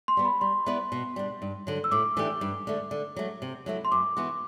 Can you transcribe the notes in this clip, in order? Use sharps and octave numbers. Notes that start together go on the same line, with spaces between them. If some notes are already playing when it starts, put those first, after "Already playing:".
C6
G3 B3
B5
G3 C6
B3 E4 B4 D5
B2
G3 D4
G2
D3 F#3
E6
A2 D6
E3 A3 D4 G4
G2
D3 A3
D3
F#3 A3
C3
F#3 A3 E4
C6
F#2 D6
E3 B3 F#4